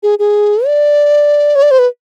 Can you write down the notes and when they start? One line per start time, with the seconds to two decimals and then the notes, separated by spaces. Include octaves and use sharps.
0.03 G#4
0.19 G#4
0.66 D5
1.55 C#5
1.62 D5
1.71 C5
1.79 B4